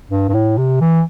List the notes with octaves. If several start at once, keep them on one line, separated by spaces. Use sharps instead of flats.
G2
G2
A2
C3
E3